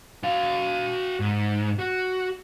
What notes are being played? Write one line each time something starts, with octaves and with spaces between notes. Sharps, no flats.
F#4 F5
G#2
F#4